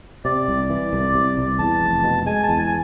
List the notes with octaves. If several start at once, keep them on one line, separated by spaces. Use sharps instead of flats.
C3 D5
C2
E3
C2
C3
C2
E2 A5
F1
B2
G#3 G#5
A5
E2
G#5